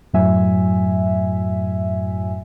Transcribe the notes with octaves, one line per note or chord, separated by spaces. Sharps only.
F#2 A2 F#3 E5 G#5